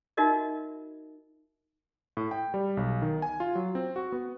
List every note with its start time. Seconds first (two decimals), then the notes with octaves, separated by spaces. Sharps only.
0.17 D#4 F4 F#4 A#4 D#5 E5
2.17 A2
2.31 G5
2.54 G3
2.77 B1
3.02 D#3
3.22 G#5
3.40 F4
3.55 F#3
3.75 C4
3.96 F#4
4.12 B3